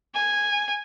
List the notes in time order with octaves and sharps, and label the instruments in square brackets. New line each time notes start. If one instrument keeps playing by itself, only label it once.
[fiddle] G#5